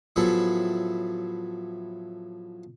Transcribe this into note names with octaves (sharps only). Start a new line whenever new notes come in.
A2 F3 F#3 B3 G#4 A4